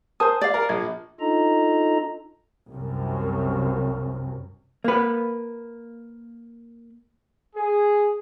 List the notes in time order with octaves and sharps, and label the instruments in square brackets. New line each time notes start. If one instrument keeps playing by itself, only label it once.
[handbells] A#4 A5 D#6 [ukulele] C5 G#5
[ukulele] D5 F5 [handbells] A6
[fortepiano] A#4
[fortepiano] A#1 [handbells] G#6
[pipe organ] D4 D#4 F4 A4 D#5 A#5
[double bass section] C2 F#2
[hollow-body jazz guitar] A#3 B4
[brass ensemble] G#4